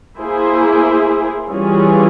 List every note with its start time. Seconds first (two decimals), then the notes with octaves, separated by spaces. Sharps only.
0.19 A#3 E4 G#4 C5
1.48 E3 G3 C#4 F4 G#4